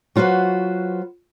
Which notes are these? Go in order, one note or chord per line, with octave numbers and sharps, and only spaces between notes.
F#3 F4 F#4 B4 C5